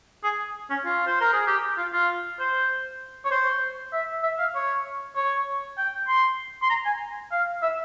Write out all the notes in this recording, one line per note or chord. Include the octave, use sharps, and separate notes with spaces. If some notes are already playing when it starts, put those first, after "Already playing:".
G#4
C#4
F4
C5
A#4
G#4
G4
F4
F4
C5
C#5
C5
E5
E5
F5
C#5
C#5
G5
C6
C6
A#5
G#5
F5
E5